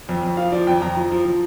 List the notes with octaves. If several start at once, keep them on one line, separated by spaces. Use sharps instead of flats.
F2
F2
F3 F5
F3 D5
F2 G5
F2 A#5
F3
F3
F3